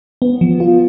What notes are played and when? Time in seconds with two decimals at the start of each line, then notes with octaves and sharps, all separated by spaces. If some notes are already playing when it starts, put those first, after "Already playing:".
0.22 B3
0.41 F3
0.60 F4